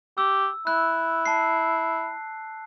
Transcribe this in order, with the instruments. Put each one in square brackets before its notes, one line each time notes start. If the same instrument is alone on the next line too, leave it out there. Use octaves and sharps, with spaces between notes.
[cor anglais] G4 [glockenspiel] E6
[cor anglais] E4 [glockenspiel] F#6
[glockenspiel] A5 C7